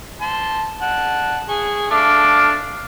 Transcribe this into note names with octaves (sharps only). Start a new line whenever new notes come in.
A5 C6
F#5 A5
G#4 C#6
A3 D4 F5 D6